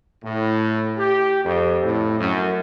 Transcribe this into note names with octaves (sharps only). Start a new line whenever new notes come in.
A2
G4
F2
A2
F#2